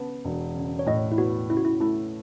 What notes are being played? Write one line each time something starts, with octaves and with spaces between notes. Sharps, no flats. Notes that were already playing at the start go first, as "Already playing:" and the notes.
Already playing: C#3 B3 A5
E1
C#3
C#5
A2 D#5
E4
B3 F#4
C#3 E4
F#4
E4
A3 E4